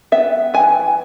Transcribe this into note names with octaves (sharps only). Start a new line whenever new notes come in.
B3 E5
E3 G#5